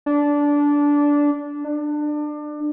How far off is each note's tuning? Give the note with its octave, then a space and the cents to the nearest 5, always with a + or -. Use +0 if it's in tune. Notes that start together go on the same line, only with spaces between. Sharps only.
D4 -15
D4 +25